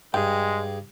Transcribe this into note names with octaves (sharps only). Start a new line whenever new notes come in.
G2 G#3 G#4 G5